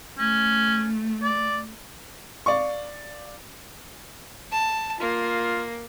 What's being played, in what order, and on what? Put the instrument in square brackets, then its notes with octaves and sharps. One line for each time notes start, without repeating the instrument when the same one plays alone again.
[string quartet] A3 [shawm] C#4
[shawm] D5
[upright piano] D5 F5 C#6
[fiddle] A5
[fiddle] A#3 [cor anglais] F4